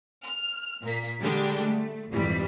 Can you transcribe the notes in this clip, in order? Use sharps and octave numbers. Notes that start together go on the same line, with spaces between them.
F6
A#2 A#3 B6
D3 G3 G#3 A#3 D4 G4
A3
A#1 F2 G#2 E3 G3